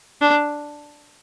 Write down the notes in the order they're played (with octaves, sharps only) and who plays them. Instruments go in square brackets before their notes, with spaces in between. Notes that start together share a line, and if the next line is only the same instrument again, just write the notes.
[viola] D4